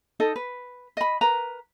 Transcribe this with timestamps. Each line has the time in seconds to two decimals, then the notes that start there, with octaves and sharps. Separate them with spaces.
0.20 D#4 A4 D#5
0.36 B4
0.97 D#5 B5
1.21 A#4 B4 A#5